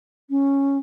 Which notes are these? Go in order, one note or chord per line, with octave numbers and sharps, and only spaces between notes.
C#4